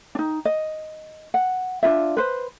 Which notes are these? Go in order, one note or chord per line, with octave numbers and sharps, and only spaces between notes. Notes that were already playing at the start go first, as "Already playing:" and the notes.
D4 D#4
D#5
F#5
D4 D#4 F4 E5
B4 C5